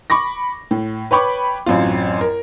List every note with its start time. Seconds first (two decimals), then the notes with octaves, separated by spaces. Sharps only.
0.10 B5 C#6 D6 A#6
0.71 A2
1.11 B4 C#5 G5 B5 C#6 D6
1.66 A1 F#2 C4 F4
2.21 A#4